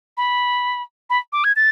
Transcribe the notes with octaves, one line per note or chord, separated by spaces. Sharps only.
B5
B5
D6
G#6
A6